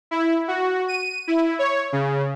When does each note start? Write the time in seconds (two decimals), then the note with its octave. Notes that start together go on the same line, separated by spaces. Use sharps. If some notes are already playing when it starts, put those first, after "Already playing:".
0.11 E4
0.48 F#4
0.88 D#7
1.28 E4
1.59 C#5
1.93 C#3